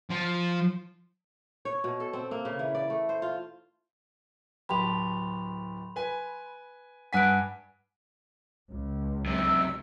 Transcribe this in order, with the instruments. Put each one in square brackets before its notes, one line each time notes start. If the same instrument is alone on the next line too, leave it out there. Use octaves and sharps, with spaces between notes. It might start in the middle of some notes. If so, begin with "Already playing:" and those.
[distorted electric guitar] F3
[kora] C#5
B2
A4
C4
A#3
C#3
E3
D5
A3
C5
F4
[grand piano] D1 G4 A5 [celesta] B5 C6 F7
[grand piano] B4 G#5
[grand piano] G2 G#5 B6 [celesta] F#5 F#6 D7
[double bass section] C#2
[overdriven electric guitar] F#2 C3 [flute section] E6